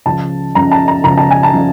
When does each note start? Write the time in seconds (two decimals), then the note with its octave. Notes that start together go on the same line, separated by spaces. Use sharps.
0.06 C#2 C#3 F3 A5
0.55 C#2 C#3 F3 A#5
0.71 A5
0.88 A#5
1.04 C#2 C#3 F3 A#5
1.17 A5
1.31 G#5
1.43 A5
1.53 C#3 F3